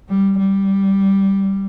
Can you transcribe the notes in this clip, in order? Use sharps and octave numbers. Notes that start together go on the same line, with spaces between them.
G3
G3